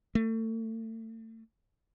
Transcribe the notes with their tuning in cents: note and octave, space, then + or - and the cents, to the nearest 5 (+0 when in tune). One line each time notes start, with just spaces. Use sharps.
A3 +35